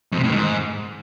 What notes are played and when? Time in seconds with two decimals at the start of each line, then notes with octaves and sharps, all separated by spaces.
0.12 F2
0.18 C3
0.24 A2
0.29 D#3
0.35 G#2